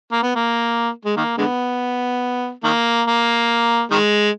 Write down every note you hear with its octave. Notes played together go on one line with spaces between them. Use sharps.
A#3
B3
A#3
G#3
D#3 A#3
D3 G#3 B3
D#3 A#3
A#3
D#3 G#3